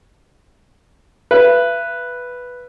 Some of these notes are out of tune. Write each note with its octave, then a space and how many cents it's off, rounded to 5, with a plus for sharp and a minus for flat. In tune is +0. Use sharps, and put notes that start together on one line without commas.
B4 +0 E5 +45